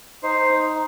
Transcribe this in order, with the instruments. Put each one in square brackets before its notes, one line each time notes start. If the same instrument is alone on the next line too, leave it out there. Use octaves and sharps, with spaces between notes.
[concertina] D#4 C5